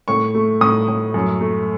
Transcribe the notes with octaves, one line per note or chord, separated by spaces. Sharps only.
A2 C#6
A3
A2 D#6
A2
F#2
A3